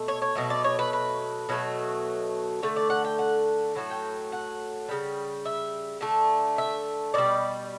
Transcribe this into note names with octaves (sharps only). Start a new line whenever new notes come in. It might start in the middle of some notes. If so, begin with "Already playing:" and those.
Already playing: B2 A3
C#5
C#5
B2 F#3 A3
D5
C#5
B4
B4
B2 F#3 A3
D3 A3
D5
F#5
G5
F#5
A2 F#3 A3
G5
F#5
C#3 G3
E5
D3 A3
E5
B2 G3 D5